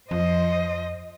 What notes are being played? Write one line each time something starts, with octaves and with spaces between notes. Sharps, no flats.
F2 F3 C5 D#5